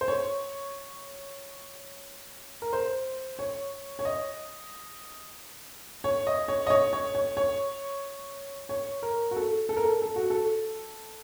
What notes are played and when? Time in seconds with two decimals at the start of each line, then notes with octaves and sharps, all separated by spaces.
0.01 C5
0.08 C#5
2.62 A#4
2.73 C5
3.39 C#5
3.99 C#5
4.05 D#5
6.04 C#5
6.27 D#5
6.48 C#5
6.67 D#5
6.70 C#5
6.93 C#5
7.15 C#5
7.37 C#5
8.69 C#5
9.02 A#4
9.31 F#4
9.36 A4
9.69 A4
9.77 A#4
9.84 A4
10.02 A4
10.16 F#4
10.30 A4